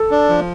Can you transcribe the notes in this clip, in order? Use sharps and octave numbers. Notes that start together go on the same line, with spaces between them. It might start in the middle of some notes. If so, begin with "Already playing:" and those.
Already playing: A4
D4
F3